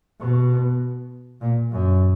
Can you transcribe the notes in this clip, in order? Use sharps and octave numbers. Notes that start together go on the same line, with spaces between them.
B2
A#2
F#2